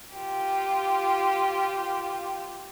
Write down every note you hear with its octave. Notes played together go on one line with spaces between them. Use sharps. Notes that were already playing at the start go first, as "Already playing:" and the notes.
F4 G4